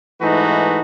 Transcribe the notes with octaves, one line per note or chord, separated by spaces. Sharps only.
G#2 E3 A3 D#4 F#4 B4